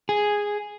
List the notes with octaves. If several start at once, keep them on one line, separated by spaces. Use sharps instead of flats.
G#4